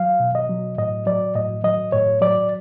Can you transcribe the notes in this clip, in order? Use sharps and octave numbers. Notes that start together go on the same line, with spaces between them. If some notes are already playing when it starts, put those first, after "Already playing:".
Already playing: F#3 F5
B2
D#5
F#3
A2 D#5
F#3 D5
A2 D#5
F#3 D#5
A2 C#5
F#3 D5